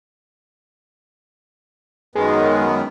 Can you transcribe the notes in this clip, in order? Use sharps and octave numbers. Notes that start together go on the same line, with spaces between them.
F#2 D#3 G#3 B3